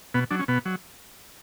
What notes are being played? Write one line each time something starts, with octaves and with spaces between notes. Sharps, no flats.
B2 B3
F#3 D4
C#4
B2 B3
F#3